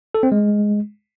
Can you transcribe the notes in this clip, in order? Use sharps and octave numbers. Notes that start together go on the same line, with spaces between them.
A4
C4
G#3